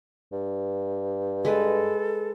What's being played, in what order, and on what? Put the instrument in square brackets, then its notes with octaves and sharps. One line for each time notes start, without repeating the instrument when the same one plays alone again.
[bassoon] G2
[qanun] G#3 B4 [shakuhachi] A4